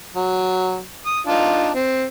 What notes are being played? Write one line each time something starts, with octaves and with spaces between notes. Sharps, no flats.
F#3
D#6
D4 D#4 F4
C4